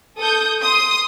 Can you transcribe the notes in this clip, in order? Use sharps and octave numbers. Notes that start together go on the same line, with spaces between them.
A4 D#6 G6
C6 D#6